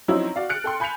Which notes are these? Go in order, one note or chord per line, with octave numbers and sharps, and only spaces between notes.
F3 F#3 C4 C#4 D#4 E4
F#4 D5 F5
F6 F#6 A6 C#7 D7
A4 G5 C6
G#5 B5 G6 B6 C#7 F7